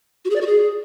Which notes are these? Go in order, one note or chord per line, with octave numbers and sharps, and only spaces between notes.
F#4
G#4
D5
F#4
G#4